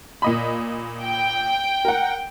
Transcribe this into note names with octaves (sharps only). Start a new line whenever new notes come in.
A#2 D#5 B5
G5
A#4 F#5